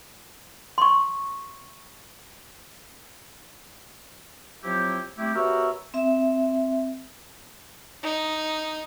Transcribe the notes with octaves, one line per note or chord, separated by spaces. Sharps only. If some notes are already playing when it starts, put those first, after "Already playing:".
C6 C#6
F3 F#3 C4 E4 G4
G3 A3 C4 E4 G4
B3 F#4 G4 A#4 C#5 E5
C4 E5
D#4